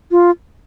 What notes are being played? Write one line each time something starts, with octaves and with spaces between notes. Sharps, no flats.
F4